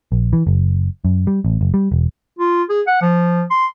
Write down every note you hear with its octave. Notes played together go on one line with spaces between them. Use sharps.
A#1
E3
F#1
F#2
G3
A1
F#1
G3
E1
F4
G#4
F#5
F3
C6